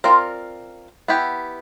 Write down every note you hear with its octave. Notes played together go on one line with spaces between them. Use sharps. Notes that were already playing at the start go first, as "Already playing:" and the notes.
C4 F4 A#4 D5
B3 E4 G4